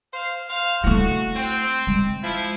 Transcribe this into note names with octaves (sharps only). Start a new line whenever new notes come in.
C5 F5
C5 F5
A3 E4 F#4
C4
G#3
F3 E4